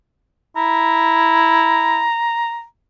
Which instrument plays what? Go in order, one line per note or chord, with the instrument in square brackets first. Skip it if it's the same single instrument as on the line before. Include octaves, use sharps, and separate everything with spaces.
[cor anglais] E4 [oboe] A#5